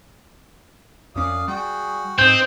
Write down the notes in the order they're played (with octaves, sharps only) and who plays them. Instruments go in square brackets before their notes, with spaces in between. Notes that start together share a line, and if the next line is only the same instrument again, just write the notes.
[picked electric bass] F2 C#4 [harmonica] D5 F5 D#6
[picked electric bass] G3 [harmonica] F#4 G#4 G5
[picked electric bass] G#2 [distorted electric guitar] C4 [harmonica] D#4 [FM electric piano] G6